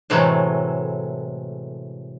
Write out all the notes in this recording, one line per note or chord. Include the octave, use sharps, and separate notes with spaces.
A2 C3 E3 F#3 G#3 A3